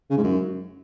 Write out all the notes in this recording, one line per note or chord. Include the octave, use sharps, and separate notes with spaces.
C#3
G#2
F#2